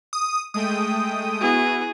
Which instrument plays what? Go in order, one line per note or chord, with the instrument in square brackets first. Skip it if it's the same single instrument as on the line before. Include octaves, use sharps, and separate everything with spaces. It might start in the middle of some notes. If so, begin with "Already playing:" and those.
[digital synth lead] D#6
[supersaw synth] G#3 A3 G5 [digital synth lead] D#6
[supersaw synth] B3 E4 F#4 [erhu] G#4